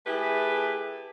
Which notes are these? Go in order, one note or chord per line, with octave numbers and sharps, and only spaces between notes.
A3 E4 G4 G#4 B4